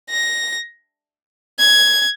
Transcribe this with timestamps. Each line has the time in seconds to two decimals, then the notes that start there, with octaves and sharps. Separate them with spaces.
0.10 A#6
1.59 G#6